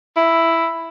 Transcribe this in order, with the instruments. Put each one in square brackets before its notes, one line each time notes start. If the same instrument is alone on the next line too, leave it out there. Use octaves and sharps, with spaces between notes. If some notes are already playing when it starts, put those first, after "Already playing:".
[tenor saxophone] E4